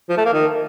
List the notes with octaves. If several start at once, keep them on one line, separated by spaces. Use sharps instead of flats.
F3
A3
A#3
D#3